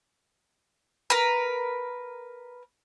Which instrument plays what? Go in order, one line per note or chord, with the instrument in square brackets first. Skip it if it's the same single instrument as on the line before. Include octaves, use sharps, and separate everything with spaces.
[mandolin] A#4 B4